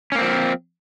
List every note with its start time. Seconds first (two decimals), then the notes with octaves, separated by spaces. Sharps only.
0.12 C#4
0.15 A#3
0.18 C4
0.22 F3